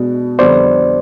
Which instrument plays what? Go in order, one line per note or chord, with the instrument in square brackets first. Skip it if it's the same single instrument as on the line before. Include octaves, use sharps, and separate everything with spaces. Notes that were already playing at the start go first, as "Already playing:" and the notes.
Already playing: [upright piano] B2 G#3 B3 D4 F#4
[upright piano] F2 D3 G3 B3 D4 [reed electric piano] C5 D5